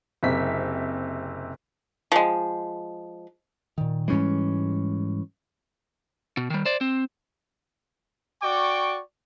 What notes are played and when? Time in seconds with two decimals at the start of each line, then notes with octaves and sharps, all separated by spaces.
0.23 F#1 C3 B6
2.12 F3 G#3
3.78 A#2 D#3
4.08 G#2 E3 G3 G#3 C#4
6.37 B2
6.50 D#3 G3
6.66 C5 D5
6.81 C4
8.43 F#4 D5 G5 C#6 D6